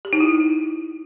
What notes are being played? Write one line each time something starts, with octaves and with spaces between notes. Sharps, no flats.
G4
D#4
E4